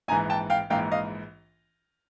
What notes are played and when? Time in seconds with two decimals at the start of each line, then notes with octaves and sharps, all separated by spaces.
0.08 A#1 G#2 E3 G#5 A#5
0.30 G5 A5
0.50 F5 G5
0.70 A#1 G#2 E3 F5 G5
0.92 D#5 F5